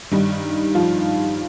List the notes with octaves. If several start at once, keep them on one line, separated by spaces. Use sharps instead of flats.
G2 D#3 G3 D#4
F3 F4